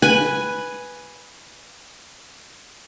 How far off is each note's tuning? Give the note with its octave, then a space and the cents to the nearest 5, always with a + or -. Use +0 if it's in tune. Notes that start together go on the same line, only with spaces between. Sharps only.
B4 +0 G#5 +0